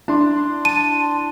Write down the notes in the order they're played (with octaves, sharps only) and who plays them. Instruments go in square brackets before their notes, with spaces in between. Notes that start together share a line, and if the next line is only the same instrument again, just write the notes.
[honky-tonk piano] D4 [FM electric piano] E4 C6
[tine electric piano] A5 [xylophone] D#7